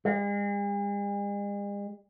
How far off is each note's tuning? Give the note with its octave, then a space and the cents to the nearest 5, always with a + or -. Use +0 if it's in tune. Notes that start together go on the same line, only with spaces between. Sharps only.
G#3 -45